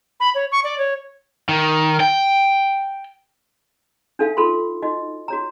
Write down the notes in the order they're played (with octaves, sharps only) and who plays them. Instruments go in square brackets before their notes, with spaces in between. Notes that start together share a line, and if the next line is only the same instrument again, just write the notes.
[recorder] B5
C#5
C#6
D5
C#5
[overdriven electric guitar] D#3
G5
[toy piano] D4 D#4 A4 E5 F5
F4 A4 B5 C6
D#4 F#4 D#5
F#4 C#5 A#5